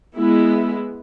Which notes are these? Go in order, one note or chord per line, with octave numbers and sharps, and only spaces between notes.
G#3 B3 E4